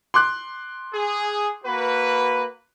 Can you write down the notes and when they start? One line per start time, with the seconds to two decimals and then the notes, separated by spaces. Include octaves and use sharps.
0.14 C6 D6 F#6
0.94 G#4
1.64 A#3 F#4 B4